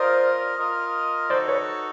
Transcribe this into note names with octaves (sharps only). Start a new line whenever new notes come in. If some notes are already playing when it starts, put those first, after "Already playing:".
Already playing: F4 A#4 C5 D5 D#5
F4 A#4 D#5
D#4 F#4 A4 C5 D5
B4 C#5